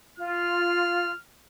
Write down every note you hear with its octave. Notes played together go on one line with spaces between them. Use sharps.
F4 F6